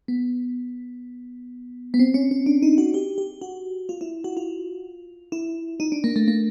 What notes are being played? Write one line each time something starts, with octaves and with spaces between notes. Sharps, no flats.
B3
B3
C4
C#4
C#4
D4
D#4
F#4
G4
G4
F#4
F4
E4
F#4
F4
E4
D#4
D4
A#3
A3
A#3